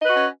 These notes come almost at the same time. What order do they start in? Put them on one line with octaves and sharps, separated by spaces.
D#5 B4 F#4 C#4